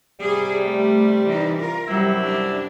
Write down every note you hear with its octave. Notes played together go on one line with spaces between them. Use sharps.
C3 G3 G#4
A3
E3 D4 D#4
F4 A#4
F#2 C3 F#3 G3 E4
D4